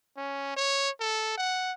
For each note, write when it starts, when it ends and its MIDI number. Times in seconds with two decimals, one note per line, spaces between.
0.17 0.56 61
0.56 0.90 73
1.00 1.36 69
1.37 1.72 78